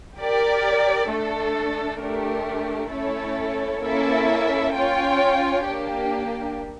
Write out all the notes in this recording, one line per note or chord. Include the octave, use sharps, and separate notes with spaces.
G4 A#4 D5
A3 D4 A4
A3 D4 G4 A#4
A3 C#4 E4 A4 C#5
A#3 C#4 E4 A4 E5
C#4 F4 C#5 G5
A#3 D4 G4